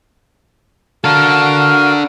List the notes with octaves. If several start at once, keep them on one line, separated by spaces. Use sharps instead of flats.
D4 F#4 A4 A#4 F5